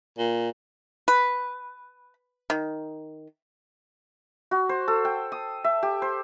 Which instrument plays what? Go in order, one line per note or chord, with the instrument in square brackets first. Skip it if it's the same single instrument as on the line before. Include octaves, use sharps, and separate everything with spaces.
[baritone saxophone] A#2
[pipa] B4
D#3
[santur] F#4
C5
A4
G5
D#6
E5
G4
C5